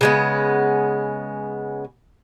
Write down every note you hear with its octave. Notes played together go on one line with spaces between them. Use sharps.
C#3 G#3 B3